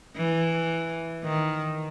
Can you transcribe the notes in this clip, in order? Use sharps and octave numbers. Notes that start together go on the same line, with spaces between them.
E3
D#3